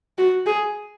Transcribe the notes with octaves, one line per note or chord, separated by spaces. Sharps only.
F#4
G#4